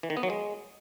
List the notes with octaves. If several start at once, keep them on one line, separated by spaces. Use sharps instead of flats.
E3
D#3
B3
F#3
G#3